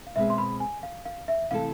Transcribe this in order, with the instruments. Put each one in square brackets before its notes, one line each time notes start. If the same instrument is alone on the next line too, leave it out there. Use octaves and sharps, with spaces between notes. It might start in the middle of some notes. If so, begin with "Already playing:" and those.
[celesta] F5
[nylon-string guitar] B2 G#3 C4 G#4 B4 [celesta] E5
[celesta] C6
B5
G#5
F5
F5
E5
[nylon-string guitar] C3 E3 A3 E4 A4 [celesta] F5